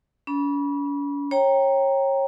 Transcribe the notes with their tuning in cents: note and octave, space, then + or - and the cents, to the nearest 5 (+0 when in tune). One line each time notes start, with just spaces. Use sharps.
C#4 +45 B5 -25
C#5 -25 G5 +0 A#5 +5